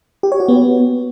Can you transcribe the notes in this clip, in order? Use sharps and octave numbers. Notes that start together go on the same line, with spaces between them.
G4
C#5
F#4
B3